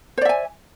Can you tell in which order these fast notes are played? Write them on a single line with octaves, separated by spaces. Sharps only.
C5 D5 E5 G#5